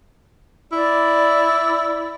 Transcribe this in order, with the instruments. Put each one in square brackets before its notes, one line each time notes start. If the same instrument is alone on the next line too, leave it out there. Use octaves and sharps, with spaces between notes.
[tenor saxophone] E4 [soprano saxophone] D5